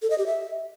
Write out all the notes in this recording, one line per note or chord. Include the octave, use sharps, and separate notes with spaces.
A4
D#5
G4
E5